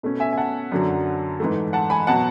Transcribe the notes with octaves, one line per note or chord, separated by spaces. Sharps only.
B2 A3 C#4
E5 G#5
G#5
F#5 A5
F#2 D3 F#3
G#2 E3 A3
F#5 A5
G#5 B5
B2 F#3 F#5 A5